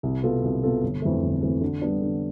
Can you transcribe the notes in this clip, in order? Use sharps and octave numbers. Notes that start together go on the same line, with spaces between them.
C2
B2 B3 F4 A4
C2
B2 B3 F4 A4
G1
F2 E3 A3
G1
F2 E3 A3
D3
G3 B3 D4
D3